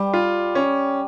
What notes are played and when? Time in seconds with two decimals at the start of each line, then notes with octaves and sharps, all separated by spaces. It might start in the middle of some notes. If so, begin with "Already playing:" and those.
Already playing: G3
0.14 F4
0.55 C#4